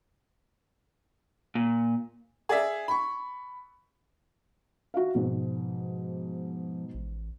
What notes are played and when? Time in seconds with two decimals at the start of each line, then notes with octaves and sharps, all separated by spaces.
1.55 A#2
2.49 G#4 D5 E5
2.88 B5 C#6
4.94 F#4 E5 F5
5.15 G#2 B2 F3
6.94 A1